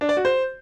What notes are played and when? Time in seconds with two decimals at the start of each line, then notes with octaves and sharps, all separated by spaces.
0.01 D4
0.09 D5
0.17 F#4
0.25 C5